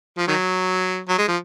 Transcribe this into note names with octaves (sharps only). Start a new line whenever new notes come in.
F3
D#3 F#3
F#3
G#3
F3